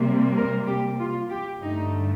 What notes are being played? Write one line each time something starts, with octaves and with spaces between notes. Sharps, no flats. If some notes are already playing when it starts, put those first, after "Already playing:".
Already playing: C3 G3 A#3
A#4
G4
F4
G4
G2 D3 A3 D#4